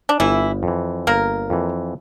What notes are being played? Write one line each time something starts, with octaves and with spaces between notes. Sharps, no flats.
D4
G1 E3 E4
F2
E3
G1 A#3 A#4
F2 E3